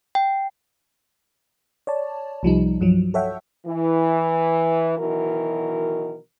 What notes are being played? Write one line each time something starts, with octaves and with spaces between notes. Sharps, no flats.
G5
C#5 D5 A5
C2 F3 G3 D#4
G2 F3 F#3
A4 C#5 E5 F#5 G5
E3
B2 D#3 E3 F#3 A#4